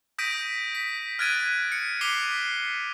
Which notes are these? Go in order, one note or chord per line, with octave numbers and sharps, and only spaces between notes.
D#6 G6 A#6 B6 D7 D#7
B6
F6 F#6 G#6 A6 D7 D#7
C#7
D6 B6 C7 D#7 F7 G7